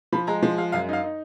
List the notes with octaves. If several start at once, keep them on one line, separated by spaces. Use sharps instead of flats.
F3 B5
G#3 A#5
F3
G#3 F5
F#2 F5
D#4 F5
D#4